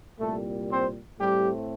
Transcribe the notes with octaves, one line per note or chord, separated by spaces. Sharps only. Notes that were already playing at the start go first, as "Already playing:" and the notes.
C2 A#2 G3 A3 A4
C4 C5
A2 G3 A3 C4 G4